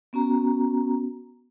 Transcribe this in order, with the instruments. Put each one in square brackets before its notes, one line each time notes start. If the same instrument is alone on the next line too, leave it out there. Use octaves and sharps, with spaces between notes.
[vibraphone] B3 C#4 F#4 A#5